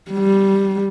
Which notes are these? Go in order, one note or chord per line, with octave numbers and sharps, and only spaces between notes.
G3